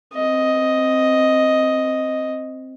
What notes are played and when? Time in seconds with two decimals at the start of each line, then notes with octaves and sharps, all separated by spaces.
0.14 C4 D#5